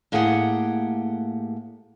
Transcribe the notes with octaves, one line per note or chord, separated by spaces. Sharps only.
A2 A#3 G4 G#4 F#5 G5